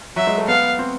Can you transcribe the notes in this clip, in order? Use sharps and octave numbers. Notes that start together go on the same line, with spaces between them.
F#3 E5
G#3
A3
B3 F5
C4